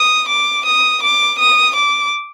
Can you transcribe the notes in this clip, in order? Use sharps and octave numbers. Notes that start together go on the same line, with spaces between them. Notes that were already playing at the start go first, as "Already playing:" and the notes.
Already playing: D#6
D6
D#6
D6
D#6
D6